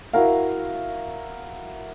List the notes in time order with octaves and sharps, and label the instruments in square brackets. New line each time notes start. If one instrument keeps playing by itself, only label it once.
[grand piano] E4 F#4 A#4 F5